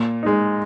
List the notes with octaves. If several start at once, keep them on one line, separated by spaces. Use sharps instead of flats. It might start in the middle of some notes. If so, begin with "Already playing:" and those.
Already playing: A#2
G#3 D#4